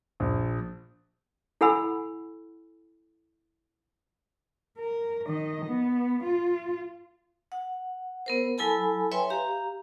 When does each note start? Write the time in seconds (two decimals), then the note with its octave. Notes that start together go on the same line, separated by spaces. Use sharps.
0.20 A#1
1.61 E4 A4 F#5 G#5 B5 E6
4.78 A#4
5.27 D#3 D#5
5.66 B3
6.24 F4
7.52 F#5
8.26 B3 A#4 C5
8.58 F#3 E4 A4 G#5 A5 B5
9.12 B4 C#5 E5 G5 G#5 C6
9.30 G4 F5 A#5